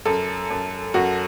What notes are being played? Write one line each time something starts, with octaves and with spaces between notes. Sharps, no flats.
F#2 A4
F#2
F#2 F#4